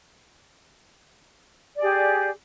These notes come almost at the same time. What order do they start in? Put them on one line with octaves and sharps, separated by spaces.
D5 G#4 G4